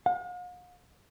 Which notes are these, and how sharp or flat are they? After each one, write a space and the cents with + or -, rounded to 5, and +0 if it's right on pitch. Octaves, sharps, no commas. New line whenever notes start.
F5 +45